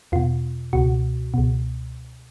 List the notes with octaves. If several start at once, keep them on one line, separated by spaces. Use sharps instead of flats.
E2 B2 F4
C#2 B2 F#4
C#2 B2